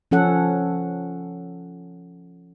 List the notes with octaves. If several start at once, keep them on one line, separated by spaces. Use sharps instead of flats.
F3 C#4 A4 F#5